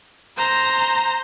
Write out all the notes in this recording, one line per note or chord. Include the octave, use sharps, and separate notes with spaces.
C5 A#5